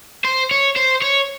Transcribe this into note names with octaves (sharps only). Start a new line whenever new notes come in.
C5
C#5
C5
C#5